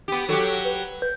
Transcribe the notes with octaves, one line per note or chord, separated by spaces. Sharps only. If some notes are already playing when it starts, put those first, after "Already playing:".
B3 G4
F#3 F#4 G4 A4
B4
G6